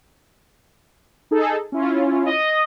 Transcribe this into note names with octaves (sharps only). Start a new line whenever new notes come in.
D#4 G#4 A4
C#4 E4 F4
D#5